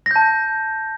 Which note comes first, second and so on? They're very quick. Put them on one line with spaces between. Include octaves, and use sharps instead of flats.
A#6 G6 A5